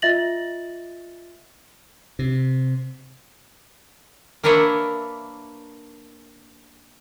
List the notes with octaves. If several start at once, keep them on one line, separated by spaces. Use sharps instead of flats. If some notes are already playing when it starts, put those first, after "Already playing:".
F4 D#5 E5 A6 A#6 F#7
C3
A#3 D4 A#4 B4 C#5 E5